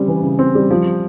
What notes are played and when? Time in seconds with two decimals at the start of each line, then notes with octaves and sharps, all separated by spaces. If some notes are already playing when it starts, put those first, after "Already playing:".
Already playing: C#3 G3 C4
0.08 E3
0.23 C#3
0.39 C4
0.55 G3
0.71 F3